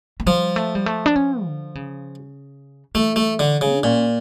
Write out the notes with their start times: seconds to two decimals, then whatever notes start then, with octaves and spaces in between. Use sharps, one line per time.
0.20 A3
0.26 F3 G3
0.56 A3
0.75 G3
0.86 A3
1.06 D4
1.16 C#4
1.46 D3
1.75 C#3
2.95 E3 A3
3.16 A3
3.39 D3
3.61 C#3
3.74 D4
3.83 A#2 C#4